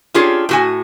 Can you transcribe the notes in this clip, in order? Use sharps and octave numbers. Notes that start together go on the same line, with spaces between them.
C#4 D4 F4 G4 G#4 C#5
A2 F#4 G#5